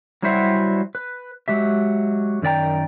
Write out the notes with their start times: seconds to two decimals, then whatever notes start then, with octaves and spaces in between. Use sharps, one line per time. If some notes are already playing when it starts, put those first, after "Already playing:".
0.22 F#3 G3 E4 F#4 C5 E5
0.95 B4
1.48 F#3 G#3 G4 E5
2.42 F#2 D#3 D5 G5 A#5